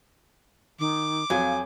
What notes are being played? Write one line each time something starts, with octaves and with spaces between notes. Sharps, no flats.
D#3 D6
F2 F#3 F5 G#5